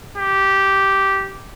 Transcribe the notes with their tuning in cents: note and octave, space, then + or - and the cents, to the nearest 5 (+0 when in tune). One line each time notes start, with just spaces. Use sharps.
G4 -10